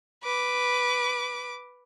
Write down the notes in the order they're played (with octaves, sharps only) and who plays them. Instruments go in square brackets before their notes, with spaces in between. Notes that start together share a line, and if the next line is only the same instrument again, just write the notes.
[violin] B4 D6